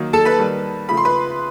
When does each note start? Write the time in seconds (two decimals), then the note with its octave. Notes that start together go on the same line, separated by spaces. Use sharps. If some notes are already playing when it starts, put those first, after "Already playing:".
Already playing: D#3 F#3 A#3
0.13 A4 A5
0.25 B4 B5
0.38 D#3 G3 A#3
0.88 C#3 F3 A3 B5
0.97 C6
1.05 B4 B5